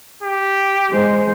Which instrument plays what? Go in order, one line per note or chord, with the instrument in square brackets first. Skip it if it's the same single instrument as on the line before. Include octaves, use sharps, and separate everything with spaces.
[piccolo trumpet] G4
[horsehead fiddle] G#3 C5